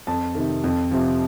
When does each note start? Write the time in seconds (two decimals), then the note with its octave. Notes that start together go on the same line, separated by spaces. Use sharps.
0.07 F2 A5
0.35 C3 D#3
0.64 F2
0.91 C3 F3